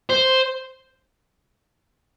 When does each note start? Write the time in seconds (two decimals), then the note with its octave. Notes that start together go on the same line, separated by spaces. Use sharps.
0.10 C5